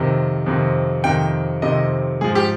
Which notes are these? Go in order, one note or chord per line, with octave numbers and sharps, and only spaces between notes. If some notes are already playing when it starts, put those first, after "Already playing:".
Already playing: F2 C3 D#3
F2 C3 D#3
F2 C3 D#3 G5
F2 C3 D#3 D#5
G#2 F3 G#4
G4